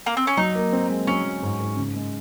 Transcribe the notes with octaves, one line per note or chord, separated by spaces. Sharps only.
A#3
C4
C#4
F#3 D#4
A#3
C4
G#3
F#3 C#4
F#3
G#2
G#2
C#3
G#3